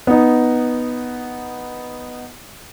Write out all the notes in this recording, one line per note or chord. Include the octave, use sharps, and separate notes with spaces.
B3 D#4